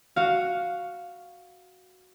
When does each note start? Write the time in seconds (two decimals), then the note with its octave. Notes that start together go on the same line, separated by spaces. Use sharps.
0.16 F#4 F5